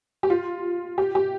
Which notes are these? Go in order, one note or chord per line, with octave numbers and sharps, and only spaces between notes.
G4
F4
G4
G4